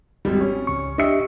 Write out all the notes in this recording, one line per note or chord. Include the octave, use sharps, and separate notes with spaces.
G#1 G3
C#4
C#2 C#6
D4 G4 D#5 E5 C#7